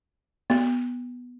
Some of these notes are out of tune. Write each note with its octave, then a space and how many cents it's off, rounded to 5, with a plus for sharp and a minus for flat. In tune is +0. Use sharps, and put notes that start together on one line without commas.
B3 -5